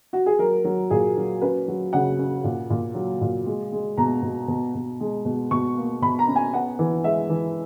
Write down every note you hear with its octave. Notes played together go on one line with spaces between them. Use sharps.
F#4
G#4
F#3 A#4
F#3
A#2 G#4
F#3
C#4 B4
F#3
C#3 F#5
C#4
A#2
A#2
F#3
A#2
G#3
G#3
B2 A#5
B2
B2
B2
G#3
B2
B2 C#6
A#3
B2 B5
A#5
C#4
G#5
B3 F#5
E3
G#3 E5
E3